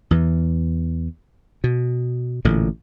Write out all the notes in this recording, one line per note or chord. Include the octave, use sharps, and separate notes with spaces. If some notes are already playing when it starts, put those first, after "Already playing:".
E2 E3
B2
A1 A#2 D3